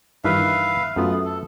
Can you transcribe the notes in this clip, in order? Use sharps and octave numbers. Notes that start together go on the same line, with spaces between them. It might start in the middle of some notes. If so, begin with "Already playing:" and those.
G2 D#3 E3 B4 E5 F5
F#2 A3 B3 F4
A4